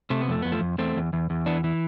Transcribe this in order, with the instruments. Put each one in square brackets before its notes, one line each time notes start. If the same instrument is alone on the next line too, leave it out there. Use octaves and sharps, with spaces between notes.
[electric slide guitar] C3 A3
B3
F2 A3
F2 B3
F3 A3
F2
E2 A3 C4
E2
E2
E2
E3 B3 D4
E3